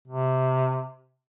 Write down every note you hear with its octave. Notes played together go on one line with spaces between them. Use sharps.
C3